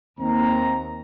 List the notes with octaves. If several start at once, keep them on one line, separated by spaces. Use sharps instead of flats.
D#2 C4 A#5